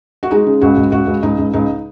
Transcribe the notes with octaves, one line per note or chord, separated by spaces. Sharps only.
F#4
G#3 D#4
C#3
C#2 F#4
C#2
C#2 F#4
C#2
C#2 D#4
C#2
C#2 D#4